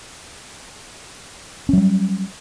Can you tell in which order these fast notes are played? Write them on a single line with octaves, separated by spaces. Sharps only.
C#4 F#3 G3